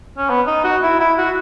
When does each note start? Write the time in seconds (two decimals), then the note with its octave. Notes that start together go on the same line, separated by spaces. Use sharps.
0.17 C#4
0.29 B3
0.47 D#4
0.64 F#4
0.83 E4
1.00 E4
1.18 F#4